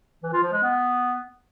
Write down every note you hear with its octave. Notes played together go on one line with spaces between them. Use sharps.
E3
F4
F3
G#3
B3